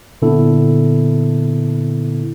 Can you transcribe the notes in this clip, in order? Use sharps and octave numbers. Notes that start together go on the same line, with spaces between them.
A#2 D3 B3 E4 A4